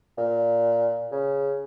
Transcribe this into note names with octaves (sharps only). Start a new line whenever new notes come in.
A#2
C#3